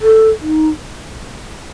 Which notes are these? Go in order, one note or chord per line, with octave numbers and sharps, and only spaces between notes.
A4
D#4